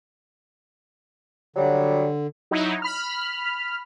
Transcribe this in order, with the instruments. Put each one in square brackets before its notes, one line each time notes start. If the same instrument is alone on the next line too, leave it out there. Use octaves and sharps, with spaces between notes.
[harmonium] D3 [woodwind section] F#3 G3
[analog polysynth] F#3 D#4 E4
B5 F6